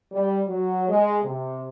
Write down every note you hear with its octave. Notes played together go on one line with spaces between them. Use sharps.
G3
F#3
G#3
C3